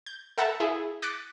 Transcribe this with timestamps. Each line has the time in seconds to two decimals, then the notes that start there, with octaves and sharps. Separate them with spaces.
0.06 G6
0.38 A4 E5 F#5 A5 A#5
0.60 E4 G#4
1.02 D6 F#6 A6 B6 C#7 D7